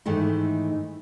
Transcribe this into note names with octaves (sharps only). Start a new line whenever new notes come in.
G#2 D#3 E3 A3 D#4